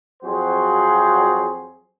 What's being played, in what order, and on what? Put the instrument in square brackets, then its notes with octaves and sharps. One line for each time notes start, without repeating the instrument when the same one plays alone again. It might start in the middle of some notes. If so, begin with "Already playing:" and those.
[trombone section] F2 F#3 C4 F#4 G#4 C5